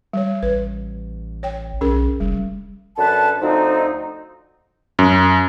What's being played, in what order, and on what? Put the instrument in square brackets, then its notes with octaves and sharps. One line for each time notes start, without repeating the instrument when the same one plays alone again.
[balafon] G3 C#5
[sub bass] A1 [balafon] B4
[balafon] C#5 G5
[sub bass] B1 [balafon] C#4 G#4 A#4
[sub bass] F1 [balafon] G3
[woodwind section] F#2 D3 B4 A5
D2 F3 C4 D#4
[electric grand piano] F#2